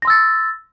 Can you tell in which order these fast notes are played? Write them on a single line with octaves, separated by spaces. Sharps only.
A#6 C6 E6 A6